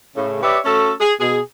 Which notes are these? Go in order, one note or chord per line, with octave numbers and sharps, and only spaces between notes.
A2 C#3
G4 B4 C#5 D5 E5
A3 C#4 F#4 A4
G#4
B2 G#4